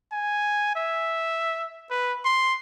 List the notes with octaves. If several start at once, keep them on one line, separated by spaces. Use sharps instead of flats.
G#5
E5
B4
C6